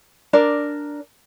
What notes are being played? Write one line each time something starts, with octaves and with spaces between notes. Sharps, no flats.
D4 A#4 D5